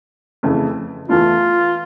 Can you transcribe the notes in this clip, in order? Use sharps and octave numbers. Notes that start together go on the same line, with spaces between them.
F2 C#3 E3 A3
E2 E3 A3 E4 F4